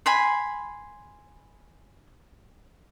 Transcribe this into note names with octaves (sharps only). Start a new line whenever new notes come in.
G#5 B5 C6